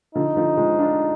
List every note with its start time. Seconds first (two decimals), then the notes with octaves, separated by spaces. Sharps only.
0.15 D3 F3 D#4
0.36 D3 F3
0.57 F3 G#3
0.79 D4 F4